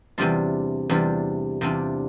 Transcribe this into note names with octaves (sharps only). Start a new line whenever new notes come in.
E2 C3 G3 D4 F4
E2 C3 G3 D4 F4
E2 C3 G3 D4 F4